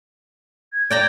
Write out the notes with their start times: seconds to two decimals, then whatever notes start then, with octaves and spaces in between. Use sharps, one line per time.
0.73 G#6
0.91 D5 G5 A#5